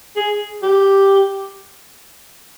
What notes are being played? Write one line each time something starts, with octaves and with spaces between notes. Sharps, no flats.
G#4
G4